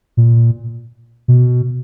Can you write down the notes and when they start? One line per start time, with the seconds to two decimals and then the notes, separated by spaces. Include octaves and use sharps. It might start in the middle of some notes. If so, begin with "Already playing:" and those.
0.17 A#2
1.28 B2